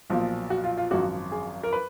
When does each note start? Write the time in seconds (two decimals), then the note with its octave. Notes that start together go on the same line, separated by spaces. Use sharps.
0.10 B1 A#2 F3
0.50 F#4
0.64 F4
0.77 F4
0.91 G#1 F#2 F3 F#4
1.32 G#4
1.63 A#4
1.73 B4